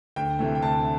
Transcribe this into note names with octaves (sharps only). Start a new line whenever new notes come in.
D2 G5
C3 E3 A3
G5
D2 A5